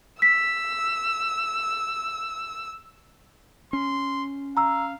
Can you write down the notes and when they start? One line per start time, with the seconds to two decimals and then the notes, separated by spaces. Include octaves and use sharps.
0.22 E6 B6
3.73 C#4 C6
4.57 F5 A#5 E6